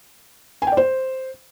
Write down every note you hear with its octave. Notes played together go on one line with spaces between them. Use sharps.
G#5
G5
D5
C5